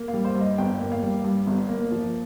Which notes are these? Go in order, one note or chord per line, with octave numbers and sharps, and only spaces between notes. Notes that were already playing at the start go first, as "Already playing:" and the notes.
Already playing: A#3
F5
G3
C5
G2
D#5
G1 G5
A#3
F5
G3
G2
G1
A#3
F3